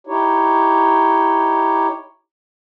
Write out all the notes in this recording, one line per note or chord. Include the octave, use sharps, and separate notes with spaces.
D#4 E4 G4 C#5